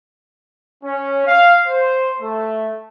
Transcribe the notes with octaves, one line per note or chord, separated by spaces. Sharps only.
C#4
F5
C5
A3